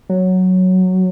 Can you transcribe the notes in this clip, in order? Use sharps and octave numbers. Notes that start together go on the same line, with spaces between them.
F#3